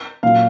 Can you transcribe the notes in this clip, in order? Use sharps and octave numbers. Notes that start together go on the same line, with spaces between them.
A#2 F#3 F5